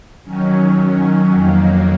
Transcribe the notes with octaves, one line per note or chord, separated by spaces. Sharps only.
D#3 F#3 C#4
F2 D#3 F#3 A#3